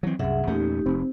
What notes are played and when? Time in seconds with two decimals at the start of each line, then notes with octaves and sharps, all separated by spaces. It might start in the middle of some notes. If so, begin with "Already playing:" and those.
0.03 E3 F#3 C4
0.19 C2 F#2 C3 G#4 E5 F#5
0.47 E2 A#2 A3 C#4 D#4 G4
0.86 F1 C4